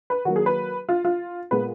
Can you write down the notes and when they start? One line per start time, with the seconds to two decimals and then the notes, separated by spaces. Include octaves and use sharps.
0.10 B4
0.25 D#3 F#3 A#3 F#4
0.36 G#4
0.46 B4
0.89 F4
1.05 F4
1.51 A#2 G#3 B3 B4